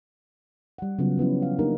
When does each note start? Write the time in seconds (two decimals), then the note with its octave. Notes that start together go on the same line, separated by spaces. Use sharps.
0.78 G3 F#5
0.99 C#3 F#3 B3 F4
1.18 F3 B3 C#4 E4
1.42 F5
1.59 A#3 D4 D#4 G4 A#4